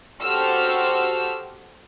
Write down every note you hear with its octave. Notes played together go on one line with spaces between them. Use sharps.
F#4 G4 A4 C5 E6 F6